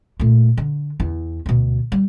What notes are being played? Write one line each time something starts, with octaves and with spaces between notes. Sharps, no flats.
A#2 A3
D3
E2 E4
D2 B2
G3